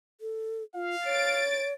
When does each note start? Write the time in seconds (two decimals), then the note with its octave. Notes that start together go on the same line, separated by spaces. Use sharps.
0.21 A4
0.75 F4 F5
1.05 C#5 A6 D7